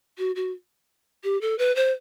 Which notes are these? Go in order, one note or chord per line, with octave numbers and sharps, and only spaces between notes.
F#4
F#4
G4
A4
B4
C5